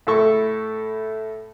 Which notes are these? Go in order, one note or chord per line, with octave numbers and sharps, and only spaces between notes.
A2 E4 A4 C#6